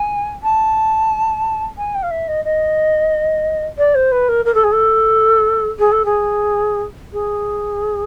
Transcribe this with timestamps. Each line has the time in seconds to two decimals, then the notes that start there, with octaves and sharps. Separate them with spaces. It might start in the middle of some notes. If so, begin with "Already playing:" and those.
Already playing: G#5
0.43 A5
1.78 G#5
1.95 G5
2.03 F5
2.11 E5
2.28 D#5
2.45 D#5
3.78 D5
3.95 C5
4.12 B4
4.29 A#4
4.45 A#4
4.54 A4
4.64 G#4
4.72 A4
5.79 G#4
5.92 A4
6.05 G#4
7.13 G#4